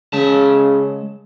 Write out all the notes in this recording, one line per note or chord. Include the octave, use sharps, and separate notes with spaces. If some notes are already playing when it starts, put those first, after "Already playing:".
C#3 G#3 A5